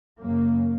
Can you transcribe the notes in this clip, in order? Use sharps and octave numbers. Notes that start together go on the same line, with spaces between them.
F#2 C#3 A#3